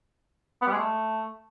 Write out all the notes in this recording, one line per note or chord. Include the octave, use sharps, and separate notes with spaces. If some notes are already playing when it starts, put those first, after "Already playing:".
B3
G3
G#3
A3